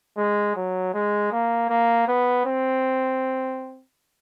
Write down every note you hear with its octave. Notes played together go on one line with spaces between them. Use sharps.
G#3
F#3
G#3
A#3
A#3
B3
C4